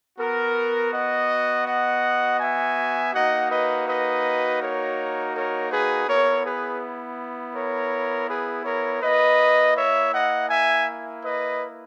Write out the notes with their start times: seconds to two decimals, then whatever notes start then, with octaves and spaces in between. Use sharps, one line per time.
0.18 B3 F#4 A#4
0.92 D#5 F#5
1.65 D#5 F#5
2.39 E5 G#5
3.13 A#3 D#4 F#4 D#5 F#5
3.49 B4 D#5
3.86 B4 D#5
4.60 A#4 C#5
5.34 A#4 C#5
5.70 G#4 B4
6.07 B3 E4 A#4 C#5
6.44 G#4 B4
7.54 A#4 C#5
8.28 G#4 B4
8.65 A#4 C#5
9.02 A#3 E4 B4 D#5
9.75 C#5 E5
10.12 D#5 F#5
10.49 E5 G#5
11.23 B4 D#5